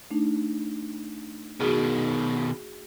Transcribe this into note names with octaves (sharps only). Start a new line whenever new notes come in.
A3 D4 D#4
B2 D#3 F#4 G#4